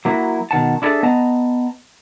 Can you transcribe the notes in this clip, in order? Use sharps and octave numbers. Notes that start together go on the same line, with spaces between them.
F#3 A#3 E4 F#4
B2 D#3 F#5 A5
D4 E4 G#4 A4 E5
B3 D#5 A5 A#5